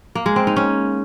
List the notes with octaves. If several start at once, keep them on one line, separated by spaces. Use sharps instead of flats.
A#3
G#3
C4
D#4
C#4